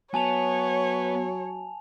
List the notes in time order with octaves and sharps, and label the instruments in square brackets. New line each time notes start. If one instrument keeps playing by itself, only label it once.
[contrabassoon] F#3 [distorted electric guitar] B3 [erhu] C#5 [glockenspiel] G#5 A5 F7